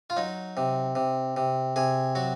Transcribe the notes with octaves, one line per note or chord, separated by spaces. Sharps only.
F4
F#3 D#4
C3
C3
C3
C3 G#4
F#3 F#4